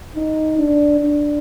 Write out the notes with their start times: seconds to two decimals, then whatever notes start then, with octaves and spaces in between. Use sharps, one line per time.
0.16 D#4
0.58 D4
1.00 D4